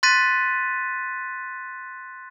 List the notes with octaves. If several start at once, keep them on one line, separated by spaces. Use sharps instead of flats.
C6 F#6 A6 B6 D#7